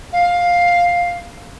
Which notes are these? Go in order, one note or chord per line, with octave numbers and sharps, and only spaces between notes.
F5